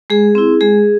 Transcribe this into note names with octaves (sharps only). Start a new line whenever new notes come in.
G#3 G#4
C4 E4
G#3 G#4